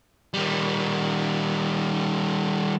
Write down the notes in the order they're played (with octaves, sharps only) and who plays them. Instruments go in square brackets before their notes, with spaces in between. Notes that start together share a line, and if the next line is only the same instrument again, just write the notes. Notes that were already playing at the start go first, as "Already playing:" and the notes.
[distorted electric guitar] D#3 G3